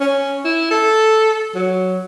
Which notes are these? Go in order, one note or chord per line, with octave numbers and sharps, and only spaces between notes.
C#4
E4
A4
F#3